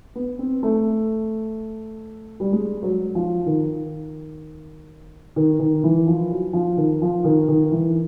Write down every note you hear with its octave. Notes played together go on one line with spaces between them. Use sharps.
B3
C4
A3
G3
G#3
F#3
F3
D#3
D#3
D#3
E3
F3
F#3
F3
D#3
F3
D#3
D#3
E3